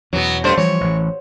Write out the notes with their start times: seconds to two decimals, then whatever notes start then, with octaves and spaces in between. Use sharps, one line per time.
0.13 E2 B2 F#3 B3
0.44 G2 A3 C5
0.57 E3 F3 G3 C#5
0.81 A1 E3